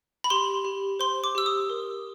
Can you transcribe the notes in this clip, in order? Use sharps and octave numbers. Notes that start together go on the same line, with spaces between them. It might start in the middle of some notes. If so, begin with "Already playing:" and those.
B5
G4 C6
G4
C5 C6
D6
G4 E6
D#6
A#4